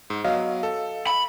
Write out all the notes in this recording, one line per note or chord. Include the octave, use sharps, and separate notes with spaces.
G#2
F#3 B3 D#5 F5
A4
B5